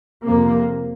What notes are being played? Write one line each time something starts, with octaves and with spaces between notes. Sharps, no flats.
F2 C3 A#3